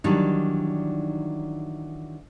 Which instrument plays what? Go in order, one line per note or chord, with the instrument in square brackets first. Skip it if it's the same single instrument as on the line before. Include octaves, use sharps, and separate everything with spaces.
[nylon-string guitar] D#3 E3 F#3 G3 D4 D#4